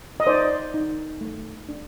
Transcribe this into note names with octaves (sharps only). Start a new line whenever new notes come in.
D#5
D#4 C5 D5
D#4
A3
D4